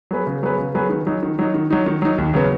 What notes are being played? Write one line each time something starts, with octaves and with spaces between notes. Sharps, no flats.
F#3 B3 G#4 B4
C#3
F#3 B3 G#4 B4
C#3
F#3 B3 G#4 B4
D#3
F#3 D#4
D#3
F#3 D#4
D#3
F#3 D#4
D#3
F#3 D#4
D#2
C#3 F#3 B3